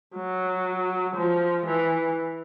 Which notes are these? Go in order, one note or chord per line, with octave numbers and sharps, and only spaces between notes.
F#3
F3
E3